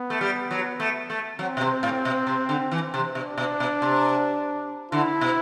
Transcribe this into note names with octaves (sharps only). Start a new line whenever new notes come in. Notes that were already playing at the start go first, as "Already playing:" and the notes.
Already playing: B3
A3
G3
F#3
A3
A3
F#3 C4
B2
C3
A2
B2
C3
D3
E3
C3
B2 D4
B2
B2
C3
D3 E4
B2